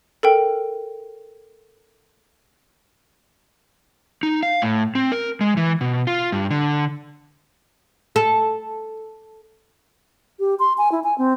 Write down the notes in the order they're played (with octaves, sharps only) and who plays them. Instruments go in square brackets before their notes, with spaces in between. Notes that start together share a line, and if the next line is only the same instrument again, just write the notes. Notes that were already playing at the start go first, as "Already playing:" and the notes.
[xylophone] A4 A#4 G5
[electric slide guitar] D#4
F5
A2
C4
A#4
G#3
E3
B2
F4
G2
D3
[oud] A4
[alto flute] G4
C6
G#5
E4
G#5
C4